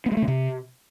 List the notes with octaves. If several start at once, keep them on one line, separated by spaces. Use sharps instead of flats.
B3
G#3
A3
C#3
C3